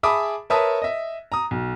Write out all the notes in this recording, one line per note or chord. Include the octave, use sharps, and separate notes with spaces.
G#4 E5 A5 B5 D6 D#6
A#4 B4 C#5 E5 A5 D#6
D#5 E5
A#5 D#6
B1